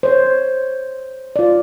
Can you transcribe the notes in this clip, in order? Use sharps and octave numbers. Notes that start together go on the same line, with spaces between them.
C5 C#5
F4 D5